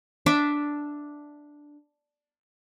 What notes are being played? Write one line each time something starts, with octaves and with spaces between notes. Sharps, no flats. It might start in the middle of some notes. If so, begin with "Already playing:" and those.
D4 E5 D6